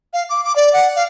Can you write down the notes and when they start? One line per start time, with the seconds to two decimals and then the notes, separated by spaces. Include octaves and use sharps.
0.13 F5
0.30 D6
0.44 D6
0.56 D5
0.73 F#5
0.96 F5